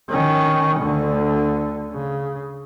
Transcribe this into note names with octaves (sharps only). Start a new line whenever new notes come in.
D#3 C#4
D2 D3
C#3